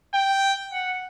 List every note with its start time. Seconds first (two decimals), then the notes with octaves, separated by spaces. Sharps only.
0.14 G5
0.72 F#5